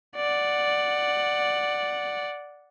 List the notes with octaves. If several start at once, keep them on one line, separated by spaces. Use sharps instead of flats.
D5 F#5